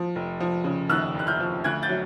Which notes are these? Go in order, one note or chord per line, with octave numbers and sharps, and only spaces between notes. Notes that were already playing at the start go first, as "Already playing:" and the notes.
Already playing: F3
F1
F3
C#3
D#2 E6 F#6
F1 F#6
F6 G6
F3
D2 F#6 G#6
G6 A6
F#3